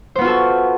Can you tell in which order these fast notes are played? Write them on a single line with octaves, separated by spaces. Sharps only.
C5 B3 F4 F#4 A4